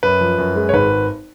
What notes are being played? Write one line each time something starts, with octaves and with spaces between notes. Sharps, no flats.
F#2 B4
F3
F#2
G#3
C#5
G#1 B4